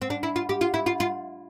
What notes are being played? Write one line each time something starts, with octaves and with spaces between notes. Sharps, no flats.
C4
D4
E4
F4
G4
F4
E4
F4
F4